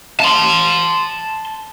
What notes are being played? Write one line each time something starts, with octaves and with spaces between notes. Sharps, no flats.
A5 C6